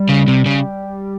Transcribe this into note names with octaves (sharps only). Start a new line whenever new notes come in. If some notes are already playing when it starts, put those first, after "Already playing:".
Already playing: G3
C#3
C3
C#3